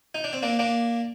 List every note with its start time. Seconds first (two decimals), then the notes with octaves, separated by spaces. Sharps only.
0.15 D#4
0.24 D4
0.33 C4
0.43 A#3 D4
0.59 A#3 D4